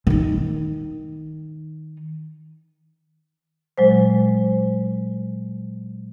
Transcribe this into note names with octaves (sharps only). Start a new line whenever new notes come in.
D#3 D#4
A#2 F#3 G#3 C5